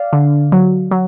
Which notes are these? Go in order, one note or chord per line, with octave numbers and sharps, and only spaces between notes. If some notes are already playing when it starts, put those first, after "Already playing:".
Already playing: D5 F5
D3
F#3
F#3